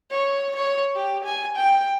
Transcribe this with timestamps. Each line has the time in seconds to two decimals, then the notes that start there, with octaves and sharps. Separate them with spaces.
0.11 C#5
0.56 C#5
0.96 G4
1.25 G#5
1.57 G5